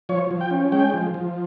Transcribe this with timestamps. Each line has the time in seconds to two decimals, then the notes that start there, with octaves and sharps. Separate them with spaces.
0.09 F3 C#5
0.31 F3
0.41 G5
0.51 C#4
0.72 G#3 G5
0.94 F3
1.14 F3